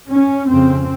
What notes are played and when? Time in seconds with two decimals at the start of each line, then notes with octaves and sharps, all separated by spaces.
0.09 C#4
0.48 F2 C#3 C4